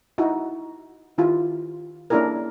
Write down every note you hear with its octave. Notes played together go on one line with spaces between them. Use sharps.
D#4 E4 F#4
D#3 E4 F4 G4
A#3 C#4 D4 E4 G#4 A#4